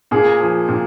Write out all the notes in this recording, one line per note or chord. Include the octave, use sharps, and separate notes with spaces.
A#2 G#4
F3
A#2